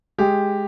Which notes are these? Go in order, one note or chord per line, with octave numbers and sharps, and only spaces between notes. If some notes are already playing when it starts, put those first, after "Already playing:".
G#3 G4